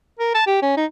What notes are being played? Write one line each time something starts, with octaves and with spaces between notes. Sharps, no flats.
A#4
A5
G4
C#4
D#4